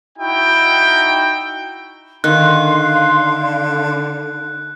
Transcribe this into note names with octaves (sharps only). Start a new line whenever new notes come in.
D#4 E4 F#4 G5
D3 D#3 F5 C6 F#6